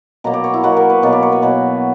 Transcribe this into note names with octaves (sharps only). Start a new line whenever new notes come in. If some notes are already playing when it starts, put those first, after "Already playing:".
B2 F#3 A#3 A#5
D5
C#5
E4
B2 F#3 A#3 F#4
A#4
B4
B2 F#3 A#3 D5
D5
C#5
B4
B2 F#3 A#3